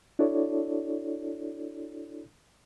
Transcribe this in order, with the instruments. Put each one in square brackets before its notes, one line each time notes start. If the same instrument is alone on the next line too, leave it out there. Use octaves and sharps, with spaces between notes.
[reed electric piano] D4 E4 F#4 A4 C#5 D5